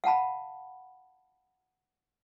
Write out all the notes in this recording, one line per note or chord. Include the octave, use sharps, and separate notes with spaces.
F5 F#5 A5 B5